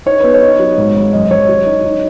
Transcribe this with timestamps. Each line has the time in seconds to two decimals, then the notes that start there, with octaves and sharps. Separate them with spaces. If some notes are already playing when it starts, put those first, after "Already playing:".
0.06 D#4 C#5
0.20 B3 B4
0.34 C#5
0.42 D#4
0.59 F#3
0.78 G#2
0.95 G#1
1.13 F#2 D#5
1.31 F#2 C#5
1.49 F#3
1.66 D#4
1.84 D#4